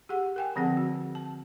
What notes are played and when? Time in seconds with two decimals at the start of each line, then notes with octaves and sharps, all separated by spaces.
0.09 G4 G#4 F#5
0.36 A#4 G5 G#5
0.56 D3 F3 C4 G#4 F#5
0.77 F#4
1.15 A5